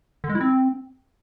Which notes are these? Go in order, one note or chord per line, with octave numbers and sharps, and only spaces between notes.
D3
G#3
E4
C4